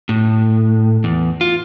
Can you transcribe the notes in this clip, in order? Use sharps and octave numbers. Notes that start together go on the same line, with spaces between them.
A2
E2
F4